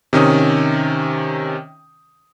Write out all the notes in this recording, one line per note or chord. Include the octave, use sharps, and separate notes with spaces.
C3 D#3 C#4 D#6